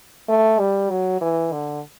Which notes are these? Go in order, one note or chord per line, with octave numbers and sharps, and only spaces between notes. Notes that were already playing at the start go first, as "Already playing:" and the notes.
A3
G3
F#3
E3
D3